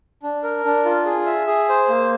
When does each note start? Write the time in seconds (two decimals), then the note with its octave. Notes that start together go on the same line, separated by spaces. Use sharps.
0.23 D4
0.43 A#4
0.65 D4
0.85 F4
1.06 G#4
1.26 E5
1.47 G#4
1.69 C5
1.89 A#3